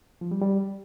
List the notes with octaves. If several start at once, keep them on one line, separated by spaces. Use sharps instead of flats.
F3
G3
G3